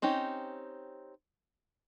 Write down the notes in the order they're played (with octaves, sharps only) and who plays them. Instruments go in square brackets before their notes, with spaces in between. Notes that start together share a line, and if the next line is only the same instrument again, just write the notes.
[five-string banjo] C4 C#4 D#4 G4